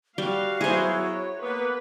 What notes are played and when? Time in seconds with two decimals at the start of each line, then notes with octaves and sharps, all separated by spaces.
0.18 G3 F#4 F5
0.61 F#3 B3 E4 G#4 C5
0.97 C#5
1.42 A#3 B3 B4